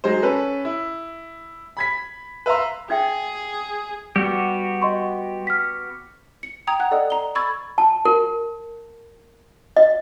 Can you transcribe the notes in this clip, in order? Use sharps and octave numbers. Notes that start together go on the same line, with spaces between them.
F#3 G#3 D#4 C5
C#4 A4 B4
E4
B5 G#6 B6
B4 E5 F5 A#5 C6
D#4 G#4 E5 G5
G3 B3 F#4 G4
D#5 C6 C#6
F6 B6
C#7
G5 A#5 D#6 G#6 F7
F#5 A#5 F#6
A4 D5 D#5 F#5 D#6
A#5 G7
B5 C#6 E6 G#6 A6
A5
A#4
D#5